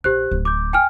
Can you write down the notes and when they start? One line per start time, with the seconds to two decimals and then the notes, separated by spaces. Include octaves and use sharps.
0.04 A#1 G4 C5 F#6
0.31 D1
0.45 D6 G6
0.73 G5 G#5 F6